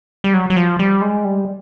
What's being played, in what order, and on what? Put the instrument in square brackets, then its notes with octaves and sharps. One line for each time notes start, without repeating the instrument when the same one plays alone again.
[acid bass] G3
F#3
F#3
F3
G3
G#3
G3